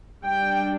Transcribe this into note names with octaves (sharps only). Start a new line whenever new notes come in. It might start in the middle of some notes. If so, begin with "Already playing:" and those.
G3 D4 G5